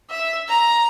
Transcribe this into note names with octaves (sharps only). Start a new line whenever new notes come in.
E5
A#5